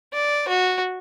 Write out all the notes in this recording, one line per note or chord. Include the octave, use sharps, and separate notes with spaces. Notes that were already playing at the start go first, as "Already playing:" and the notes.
D5
F#4